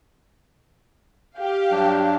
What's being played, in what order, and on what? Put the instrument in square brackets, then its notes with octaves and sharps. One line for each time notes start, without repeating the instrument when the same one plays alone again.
[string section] G4 F5
[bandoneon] G2 F#3 D4